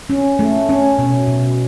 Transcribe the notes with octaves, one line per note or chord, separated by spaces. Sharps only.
C#4
A3
C#4
B2
B2